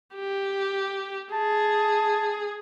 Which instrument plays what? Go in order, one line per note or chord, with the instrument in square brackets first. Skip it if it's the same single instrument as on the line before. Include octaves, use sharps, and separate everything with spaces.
[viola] G4
[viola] G#4 [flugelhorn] A5